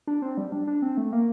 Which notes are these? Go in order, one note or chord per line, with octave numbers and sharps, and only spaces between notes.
D4
C4
G3
D4
D4
C4
A3
A#3